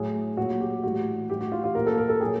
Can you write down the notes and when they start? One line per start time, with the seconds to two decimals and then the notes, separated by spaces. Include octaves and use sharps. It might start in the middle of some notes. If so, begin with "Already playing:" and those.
Already playing: A2 F#3 G#4
0.37 A#2 F#3 F#4
0.61 G4
0.83 A2 E3 G3 F#4
1.29 A2 E3 G3 G4
1.41 F#4
1.52 F4
1.64 F4
1.75 A#2 F3 A#4
1.87 A4
1.98 A#4
2.09 A4
2.21 A#2 F#3 G#4